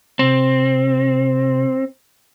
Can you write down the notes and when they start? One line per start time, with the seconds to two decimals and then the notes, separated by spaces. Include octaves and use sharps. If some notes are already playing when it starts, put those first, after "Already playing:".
0.19 C3 C4